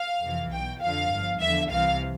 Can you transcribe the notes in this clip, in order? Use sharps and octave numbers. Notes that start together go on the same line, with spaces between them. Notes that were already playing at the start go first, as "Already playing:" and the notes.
Already playing: F5
F2 C3 E3
B1 B2 G5
F2 D3 F3 F5
G1 G2 F3
E2 D3 F3 E5
C2 C3 E3 F5